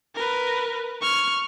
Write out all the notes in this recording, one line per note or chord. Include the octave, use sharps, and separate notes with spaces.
A#4 B4
C#6 F6